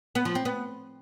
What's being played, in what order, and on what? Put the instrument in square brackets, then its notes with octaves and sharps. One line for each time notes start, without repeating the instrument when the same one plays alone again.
[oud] B3
F3
C4
B3